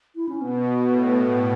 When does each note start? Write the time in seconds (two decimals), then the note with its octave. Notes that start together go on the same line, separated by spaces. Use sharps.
0.16 E4
0.29 C#4
0.41 B2 B3
0.88 A2